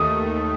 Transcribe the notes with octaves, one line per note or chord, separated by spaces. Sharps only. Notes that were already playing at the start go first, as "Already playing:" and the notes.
Already playing: D#2 D#3 A3 D#6